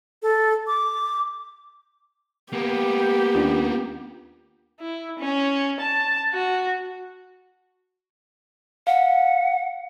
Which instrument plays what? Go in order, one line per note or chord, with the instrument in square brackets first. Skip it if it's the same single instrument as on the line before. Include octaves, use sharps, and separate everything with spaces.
[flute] A4
D6
[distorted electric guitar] A#3 B3 [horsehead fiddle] G4
[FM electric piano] D#2 D4 [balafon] C#4 F4
[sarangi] E4
C#4
A5
F#4
[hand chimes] F5 [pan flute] F#5